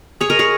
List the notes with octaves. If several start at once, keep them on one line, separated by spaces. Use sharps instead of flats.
G#4 C#5
A#4 D#5
G#4 C#5